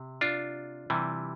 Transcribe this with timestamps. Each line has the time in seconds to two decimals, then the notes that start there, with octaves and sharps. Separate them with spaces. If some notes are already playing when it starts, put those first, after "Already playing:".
Already playing: C3
0.21 D4 F4
0.90 C3 E3 G3